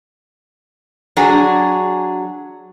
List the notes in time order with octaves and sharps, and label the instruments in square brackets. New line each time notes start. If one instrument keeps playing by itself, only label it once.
[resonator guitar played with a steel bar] F#3 D4 F#4 G#4